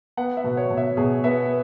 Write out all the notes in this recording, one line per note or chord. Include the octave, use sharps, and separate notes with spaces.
B3 F#5
E5
B2
C#5
B2
E5
B2 G#4
B3 E5